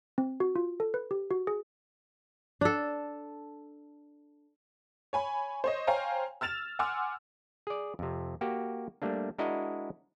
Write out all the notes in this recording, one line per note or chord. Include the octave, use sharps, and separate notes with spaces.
C4
F#4
F4
A4
B4
G4
F#4
G#4
D4 A4
C#5 G#5 B5
C5 C#5 D#5
C5 C#5 F5 G5 G#5 A#5
E6 F6 A6 E7 F7
F#5 G#5 C6 D6 E6 F6
G#4 D5
F2 C3
A#3 F#4 G4
G3 A3 A#3 D4
G#3 D4 E4 F#4 A#4 D#5